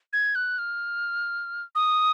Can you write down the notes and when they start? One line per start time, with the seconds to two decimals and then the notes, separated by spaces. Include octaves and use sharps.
0.13 G#6
0.35 F#6
0.58 F6
1.75 D#6